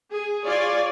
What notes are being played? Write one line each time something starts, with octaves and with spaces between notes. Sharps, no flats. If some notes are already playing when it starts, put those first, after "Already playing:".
G#4
F4 G#4 C#5 D5